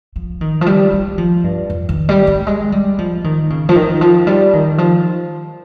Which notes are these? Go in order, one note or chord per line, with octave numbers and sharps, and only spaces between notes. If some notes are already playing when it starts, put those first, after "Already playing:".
F3
D#3
F3
G3
G3
F3
G2
F2
D#3
G3
G3
G#3
G3
F3
D#3
C#3
F3
D#3
F3
G3
D#3
F3